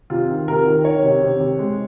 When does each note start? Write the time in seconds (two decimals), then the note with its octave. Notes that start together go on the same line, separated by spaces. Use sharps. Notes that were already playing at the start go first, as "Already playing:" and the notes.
0.10 C3 F4
0.29 D#3
0.48 C3 A#4
0.66 D#3
0.84 D#3 C#5
1.04 C3
1.22 C3
1.40 C3
1.59 G#3